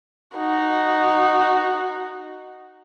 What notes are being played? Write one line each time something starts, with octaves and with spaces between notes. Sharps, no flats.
D#4 F#4